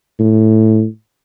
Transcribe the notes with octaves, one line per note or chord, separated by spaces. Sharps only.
A2